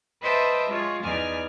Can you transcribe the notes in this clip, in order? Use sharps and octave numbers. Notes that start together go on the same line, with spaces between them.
B4 C5 D#5 E5 G5 A5
G#3 F4 C#5
E2 D#4 D5 G#5 F6